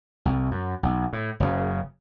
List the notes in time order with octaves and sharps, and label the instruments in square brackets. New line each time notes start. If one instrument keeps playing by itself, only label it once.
[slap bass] C2
F#2
B1
A2
F#1 F#2 A2 C#3